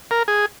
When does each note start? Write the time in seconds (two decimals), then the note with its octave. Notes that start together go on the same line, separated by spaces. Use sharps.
0.11 A#4
0.28 G#4